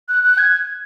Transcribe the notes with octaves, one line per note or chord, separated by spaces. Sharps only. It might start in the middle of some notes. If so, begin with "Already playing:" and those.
F#6
F#6
G#6